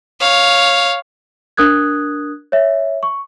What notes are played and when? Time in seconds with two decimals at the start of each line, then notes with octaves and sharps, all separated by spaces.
0.20 C#5 F5
1.57 D4 A#4 D#6 F#6 G#6
2.52 C#5 E5
3.03 C#6